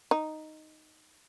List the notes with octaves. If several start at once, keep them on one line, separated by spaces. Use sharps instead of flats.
D#4